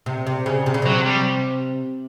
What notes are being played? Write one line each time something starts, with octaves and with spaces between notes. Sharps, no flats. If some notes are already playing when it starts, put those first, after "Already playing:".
C3
C3
C#3
C3
C#3
C3 F#3
G3